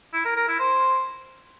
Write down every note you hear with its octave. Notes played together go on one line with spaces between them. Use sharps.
E4
A#4
A#4
E4
C5